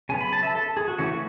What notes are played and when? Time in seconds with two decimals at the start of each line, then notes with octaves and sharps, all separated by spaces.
0.09 C#3 F#3 B3 G#5
0.21 B5
0.33 A5
0.43 E5
0.55 A4
0.77 G#4
0.88 F#4
0.98 C#3 E3 A3 C#4 F#4